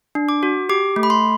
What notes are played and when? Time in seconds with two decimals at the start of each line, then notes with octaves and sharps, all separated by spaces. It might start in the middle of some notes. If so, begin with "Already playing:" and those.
0.15 D4
0.29 D6
0.43 F#4
0.69 G4 D6
0.96 A3
1.03 B5
1.10 C6